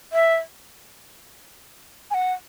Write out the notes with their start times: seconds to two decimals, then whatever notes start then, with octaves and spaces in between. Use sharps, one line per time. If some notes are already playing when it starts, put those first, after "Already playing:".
0.13 E5
2.11 G#5
2.14 F#5